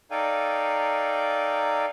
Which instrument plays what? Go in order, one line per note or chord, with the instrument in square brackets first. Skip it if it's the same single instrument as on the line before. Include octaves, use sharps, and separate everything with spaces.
[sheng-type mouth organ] D#4 A4 D5 F5 G5 G#5